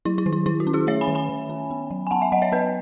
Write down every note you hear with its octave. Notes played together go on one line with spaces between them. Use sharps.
F#3 E4
E4
D#3
E4
D#3 E4
F#4
C#4
E4 G#4
A3 C#5 E5
G#5 B5
D#3
G#5 B5
D#3
C#4
B3
F#3
G#5
B3 F#5 A5
E5 G#5
F#3 D#5 F#5
C#5 E5
B3 B4 D#5